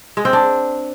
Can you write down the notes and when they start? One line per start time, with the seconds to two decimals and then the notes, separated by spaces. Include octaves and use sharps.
0.17 G#3
0.25 C4
0.33 D4